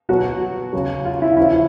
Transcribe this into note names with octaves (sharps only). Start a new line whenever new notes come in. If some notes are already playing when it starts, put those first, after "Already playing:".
B2 F#3 F#4
C#3 F#3
F4
E4
C#3 F3 E4